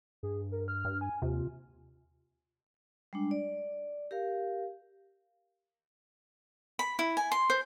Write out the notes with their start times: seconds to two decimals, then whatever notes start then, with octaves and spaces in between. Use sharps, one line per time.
0.23 G2 G#4
0.52 A#4
0.68 F6
0.85 G2
1.01 G#5
1.22 D#2 C3 F4
3.13 G3 G#3 D4
3.31 D5
4.11 G4 A#4 F5
6.79 B5
6.99 E4
7.17 G#5
7.32 C6
7.50 C5